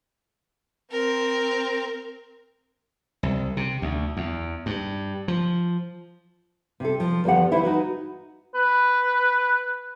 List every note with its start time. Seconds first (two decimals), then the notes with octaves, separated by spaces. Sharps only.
0.92 C4 A#4
3.23 C2
3.57 C3
3.82 D2
4.17 E2
4.66 G2
5.28 F3
6.80 C3 A4
7.00 F3
7.24 E2 D3 F3 G4 F#5
7.51 E3 E4 C5
7.63 D#4 F#4 B4
8.55 B4